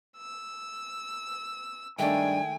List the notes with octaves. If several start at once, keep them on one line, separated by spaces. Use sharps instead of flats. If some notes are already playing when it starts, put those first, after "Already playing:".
E6
G2 D#3 G#3 A3 D4 G5 G#5